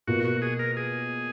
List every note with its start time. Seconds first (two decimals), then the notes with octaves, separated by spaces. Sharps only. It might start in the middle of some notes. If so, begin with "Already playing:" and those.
0.07 B2 A#3 F4 F#4
0.25 F#4
0.42 G#4
0.59 A#4
0.77 G#4